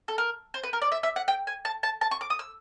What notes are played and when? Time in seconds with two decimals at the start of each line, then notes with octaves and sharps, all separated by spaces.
0.08 A4
0.18 A#4
0.54 C5
0.63 B4
0.73 A#4
0.82 D5
0.92 E5
1.03 E5
1.16 F#5
1.28 G5
1.47 G#5
1.65 A5
1.83 A5
2.01 A5
2.11 C#6
2.21 D6
2.30 D#6
2.39 E6